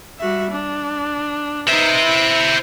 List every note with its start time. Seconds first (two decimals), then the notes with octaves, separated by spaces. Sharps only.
0.20 G3 F#4 E5
0.51 D4
1.68 D#4 B4 C5 E5
2.04 E4